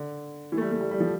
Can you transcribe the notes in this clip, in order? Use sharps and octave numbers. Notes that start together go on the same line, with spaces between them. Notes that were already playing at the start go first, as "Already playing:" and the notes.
Already playing: D3
E3
A3
G3
A3
G3
G3
F3